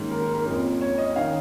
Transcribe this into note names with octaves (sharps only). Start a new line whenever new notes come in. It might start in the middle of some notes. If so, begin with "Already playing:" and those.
Already playing: G#2 D#3 A#3 C#4
A#4
A#4
A#4
F2 F3 A#3 C#4
C#5
D#5
D#3 C#4 F5